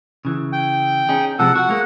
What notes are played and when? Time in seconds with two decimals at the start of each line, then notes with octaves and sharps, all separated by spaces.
0.25 C#3 E3
0.53 G5
1.09 C#4 D#4 G#4
1.39 C3 F3 G#3 A4 F#5
1.56 F#4 F#5
1.69 G#3 A#3